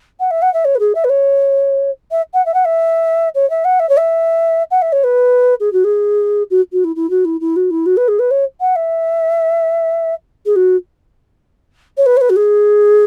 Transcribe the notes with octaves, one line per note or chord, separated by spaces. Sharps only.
F#5
E5
F#5
E5
C#5
B4
G#4
E5
B4
C#5
E5
F#5
E5
F#5
E5
C#5
E5
F#5
E5
C#5
E5
F#5
E5
C#5
B4
G#4
F#4
G#4
F#4
F#4
E4
E4
F#4
E4
E4
F#4
E4
F#4
B4
G#4
B4
C#5
F#5
E5
G#4
F#4
C#5
B4
C#5
B4
F#4
G#4